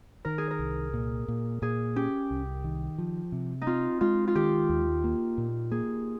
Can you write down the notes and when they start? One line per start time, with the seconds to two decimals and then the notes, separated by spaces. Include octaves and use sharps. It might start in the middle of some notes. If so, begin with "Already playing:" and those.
0.25 D#3 A#4
0.38 G#4
0.51 A#4
0.59 C2
0.94 A#2
1.28 A#2
1.62 A#2 G#4
1.96 C#4 G4
2.31 C2
2.64 D#3
2.98 F3
3.32 C3
3.62 D#4
3.67 C4 F4
4.01 G#3 F4
4.27 F4
4.35 D#3 G4
4.69 D#2
5.04 A#3
5.38 A#2
5.71 A#3 G#4